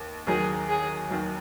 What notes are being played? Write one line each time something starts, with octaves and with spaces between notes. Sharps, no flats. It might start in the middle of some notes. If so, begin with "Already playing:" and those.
Already playing: D#2
D#2 D#3 F#3 G#4
G#4
D#2 D#3 F#3